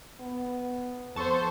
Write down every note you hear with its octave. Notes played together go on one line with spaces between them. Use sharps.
B3
F2 B3 A4 C5 A5 C#6